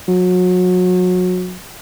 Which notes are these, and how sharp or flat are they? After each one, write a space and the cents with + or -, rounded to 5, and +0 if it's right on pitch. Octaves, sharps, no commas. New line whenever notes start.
F#3 -30